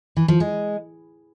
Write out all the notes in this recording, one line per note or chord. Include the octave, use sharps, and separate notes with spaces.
E3
F3
G#3